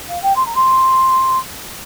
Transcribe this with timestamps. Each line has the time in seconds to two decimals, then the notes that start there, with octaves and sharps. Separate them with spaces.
0.09 F5
0.23 G5
0.36 C6
0.46 A#5
0.55 C6